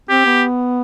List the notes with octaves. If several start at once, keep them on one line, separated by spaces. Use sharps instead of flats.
C4 G4
B3